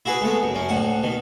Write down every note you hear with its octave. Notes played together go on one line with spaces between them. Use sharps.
E4 F#4 G#4 B4
G#3 A3 B3
F#2
F#2 C#4
D2 A2 F#5
B2 D#3